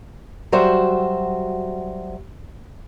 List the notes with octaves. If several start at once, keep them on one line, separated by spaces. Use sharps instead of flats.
F#3 G3 F#4 C5 E5